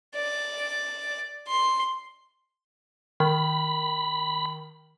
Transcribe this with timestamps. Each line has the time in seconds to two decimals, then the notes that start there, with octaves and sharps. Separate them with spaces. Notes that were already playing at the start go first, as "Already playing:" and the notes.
0.15 D5
1.48 C6
3.20 D#3 B5